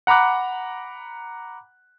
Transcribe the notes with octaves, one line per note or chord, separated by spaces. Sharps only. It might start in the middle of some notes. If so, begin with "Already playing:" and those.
F#5 A#5 B5 D6 F#6